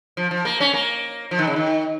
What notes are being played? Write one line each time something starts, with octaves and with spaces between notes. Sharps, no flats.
F3
F3
A#3
C#4
A#3
F3
D#3
C#3
D#3